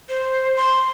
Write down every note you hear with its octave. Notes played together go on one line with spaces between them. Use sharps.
C5
C6